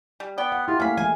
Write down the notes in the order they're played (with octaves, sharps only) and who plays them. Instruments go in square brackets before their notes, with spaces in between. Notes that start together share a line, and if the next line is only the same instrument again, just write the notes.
[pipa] G3
[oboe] B3 [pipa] D5 G5
[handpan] F#5
[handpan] E4 G4 [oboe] F4
[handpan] A3 A#3 E4 [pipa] C#4 B5 [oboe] F5
[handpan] E3 G#3 [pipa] G#5